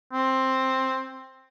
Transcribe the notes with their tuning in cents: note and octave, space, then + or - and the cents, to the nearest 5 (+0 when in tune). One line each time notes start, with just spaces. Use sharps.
C4 +10